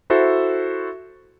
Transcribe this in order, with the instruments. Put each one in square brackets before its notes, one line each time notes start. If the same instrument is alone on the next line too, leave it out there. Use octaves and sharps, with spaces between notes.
[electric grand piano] E4 F#4 A4 C5 E5